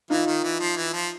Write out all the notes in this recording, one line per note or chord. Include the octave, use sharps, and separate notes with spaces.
E3 D#4 F4
D#3
E3
F3
E3
F3